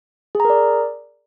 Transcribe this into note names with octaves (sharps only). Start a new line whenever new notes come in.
G#4 A#4 D5 A#5